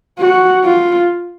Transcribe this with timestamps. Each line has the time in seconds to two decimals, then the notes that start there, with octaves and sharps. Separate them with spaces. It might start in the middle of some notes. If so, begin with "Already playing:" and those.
0.19 F#4
0.64 F4